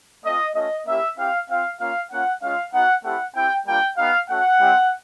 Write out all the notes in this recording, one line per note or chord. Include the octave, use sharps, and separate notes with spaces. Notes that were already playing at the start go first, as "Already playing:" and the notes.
A3 C4 F4 D#5
A3 C#4 F4 D#5
A#3 C#4 E4 G4 E5
C4 E4 G4 F5
C4 F4 F5
A#3 C#4 F4 F5
A#3 C#4 F4 F#5
G#3 C#4 F4 F5
B3 D#4 F#4 F#5
A3 C4 E4 G4 F#5
C4 E4 G4 G5
G3 A#3 D4 F4 G5
B3 D#4 G4 F5
A3 C#4 F#4 F#5
G3 C4 E4 G4